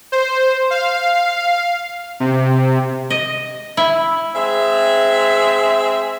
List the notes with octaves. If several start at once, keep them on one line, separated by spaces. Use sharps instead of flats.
C5
F5
C3
D#5
E4
G#3 C4 E5